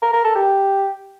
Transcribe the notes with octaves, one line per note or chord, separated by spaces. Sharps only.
A#4
A#4
A4
G4